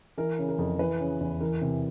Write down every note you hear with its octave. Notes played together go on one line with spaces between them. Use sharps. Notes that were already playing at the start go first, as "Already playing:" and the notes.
E3 A#4
C#3
A#4
F2
E3 B4
C#3
E2
E3 A#4
C3